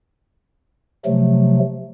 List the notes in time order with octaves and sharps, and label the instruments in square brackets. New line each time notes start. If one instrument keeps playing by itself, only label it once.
[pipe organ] C3 F3 F#3 A3